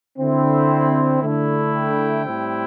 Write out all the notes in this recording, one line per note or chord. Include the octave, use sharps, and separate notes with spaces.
D3 C4 E4
D3 A3 E4
G5
A2 G3 C4 E4